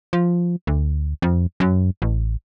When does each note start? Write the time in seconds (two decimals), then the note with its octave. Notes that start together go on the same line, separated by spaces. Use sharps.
0.13 F3
0.67 D2
1.22 F2
1.60 F#2
2.02 A1